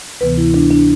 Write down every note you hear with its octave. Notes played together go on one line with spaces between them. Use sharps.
D2 C3 E3 B3 B4
E4
D4
D4